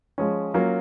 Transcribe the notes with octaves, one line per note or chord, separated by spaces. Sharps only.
F3 G#3 C#4
F#3 A#3 C#4 F4